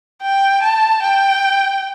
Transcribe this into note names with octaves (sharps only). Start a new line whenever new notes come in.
G5
A5
G5